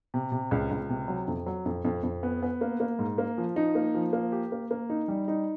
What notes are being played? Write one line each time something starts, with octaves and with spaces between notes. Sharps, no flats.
C3
C3
C#2
C#2
C3
F#3
F2
F#3
F2
F2
F2
B3
B3
A#3
A#3
G#2
A#3
F3
D#4
A#3
F3
A#3
G4
A#3
A#3
D#4
G3
D#4